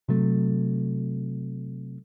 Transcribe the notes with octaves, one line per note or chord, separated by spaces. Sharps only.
C3 F#3 A3